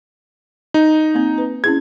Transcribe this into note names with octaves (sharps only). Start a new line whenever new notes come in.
D#4
A#3 C4
B4
C#4 E4 G#4 G#6